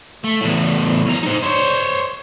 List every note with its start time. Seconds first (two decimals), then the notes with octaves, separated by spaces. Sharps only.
0.24 A3
0.41 E2 A2
1.06 B1 A#5
1.23 D#4 C5
1.43 C5 C#5